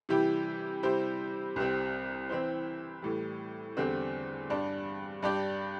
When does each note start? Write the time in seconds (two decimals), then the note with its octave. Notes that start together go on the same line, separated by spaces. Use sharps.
0.09 C3 E3 G3 E4 G4
0.83 C3 G3 E4 G4 C5
1.56 C2 C3 G3 C4
2.29 E3 C4 E4 C5
3.02 A2 E3 G3
3.76 E2 D3 G3 C4
4.50 G2 G3 D4
5.22 G2 G3 D4 G4 D5